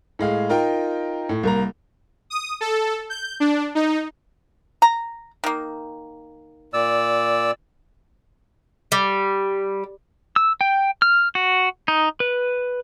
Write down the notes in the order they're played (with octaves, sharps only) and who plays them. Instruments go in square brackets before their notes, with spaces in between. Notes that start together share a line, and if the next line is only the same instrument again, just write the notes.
[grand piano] A2 G#3 F5
D#4 F4 A#4 G5
A2
C2 A#3 A#5
[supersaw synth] D#6
A4
G6
D4
D#4
[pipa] A#5
D#3 A#3
[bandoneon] A#2 D5 E6
[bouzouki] G3
[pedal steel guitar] E6
G5
F6
F#4
D#4
B4